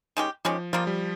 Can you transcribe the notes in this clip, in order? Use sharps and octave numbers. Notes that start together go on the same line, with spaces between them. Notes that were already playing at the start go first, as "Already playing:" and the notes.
D#3 G#3 C#4 G4
D#3 F3 G#3 C#4 G4
C#3 F3 G3 A#3 F4
G3